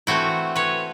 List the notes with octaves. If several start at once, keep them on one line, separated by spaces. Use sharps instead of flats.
E3 A3 C4 E4 F#4
B4 C#5